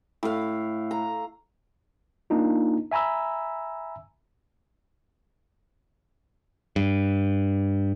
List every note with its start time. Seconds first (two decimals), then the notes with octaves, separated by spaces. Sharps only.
0.23 A2 F5
0.91 A#5
2.30 A#3 D4 D#4 F4
2.91 E5 G#5 A#5 B5 E6
6.76 G2